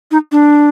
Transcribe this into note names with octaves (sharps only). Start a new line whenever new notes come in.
D#4
D4